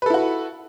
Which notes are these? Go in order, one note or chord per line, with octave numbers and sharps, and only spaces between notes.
E4 F#4 A4 B4